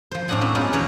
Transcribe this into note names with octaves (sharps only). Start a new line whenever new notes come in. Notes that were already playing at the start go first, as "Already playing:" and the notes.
F3 C5
A2 C4 D4 D#5 F#5 G#5
F#3 C4 G5 B5
G#3 B3 C#4 D#4 F4 G4
E2 B2 F#3 B3 B4 C#5